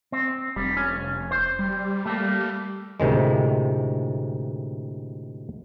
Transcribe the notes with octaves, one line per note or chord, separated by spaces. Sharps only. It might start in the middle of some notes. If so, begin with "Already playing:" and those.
C4
F1 G3
C#4
C5
G3
A3 A#3
D2 A2 C3 D#3 G#3